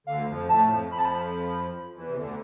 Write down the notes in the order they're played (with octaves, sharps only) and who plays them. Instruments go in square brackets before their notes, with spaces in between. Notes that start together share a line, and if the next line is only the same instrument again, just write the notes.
[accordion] D2 D3 [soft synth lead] F5
[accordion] F2 F3
[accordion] A2 A3 [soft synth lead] A5
[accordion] F2 F3
[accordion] F2 F3 [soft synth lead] B5
[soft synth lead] A5
B5
[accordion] E2 E3
C3
D2 D3